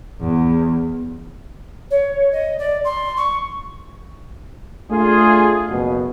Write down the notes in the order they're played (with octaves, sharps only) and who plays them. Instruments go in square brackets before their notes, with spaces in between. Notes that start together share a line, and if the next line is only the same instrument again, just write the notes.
[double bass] E2
[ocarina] C#5
D#5
D5
C6
C#6
[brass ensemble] A3 D4 F4 G#4
F#1 B2